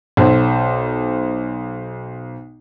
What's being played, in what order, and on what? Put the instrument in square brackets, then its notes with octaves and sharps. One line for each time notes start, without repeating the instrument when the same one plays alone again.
[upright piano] B1 C5